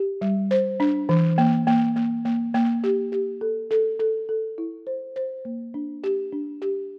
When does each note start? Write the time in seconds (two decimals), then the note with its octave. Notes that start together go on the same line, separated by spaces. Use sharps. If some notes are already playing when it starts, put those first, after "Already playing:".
Already playing: G4
0.21 G3
0.51 C5
0.80 D4
1.09 E3
1.38 A#3
1.67 A#3
1.96 A#3
2.25 A#3
2.54 A#3
2.84 G4
3.12 G4
3.41 A4
3.71 A4
4.00 A4
4.29 A4
4.58 E4
4.87 C5
5.16 C5
5.45 A#3
5.74 D4
6.04 G4
6.33 D4
6.62 G4